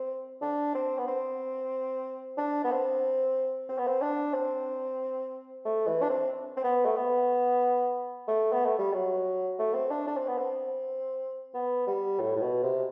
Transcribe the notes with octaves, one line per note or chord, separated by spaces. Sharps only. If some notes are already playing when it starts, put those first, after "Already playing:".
Already playing: C4
D4
C4
B3
C4
D4
B3
C4
C4
B3
C4
D4
C4
A3
E3
D4
C4
C4
B3
A3
B3
A3
B3
A3
G3
F#3
A3
C4
D4
D4
C4
B3
C4
B3
G3
A2
A2
B2
C3